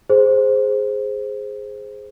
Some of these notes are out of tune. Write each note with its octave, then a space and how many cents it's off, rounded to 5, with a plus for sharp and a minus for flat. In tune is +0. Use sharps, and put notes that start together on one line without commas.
G#4 +0 C5 +0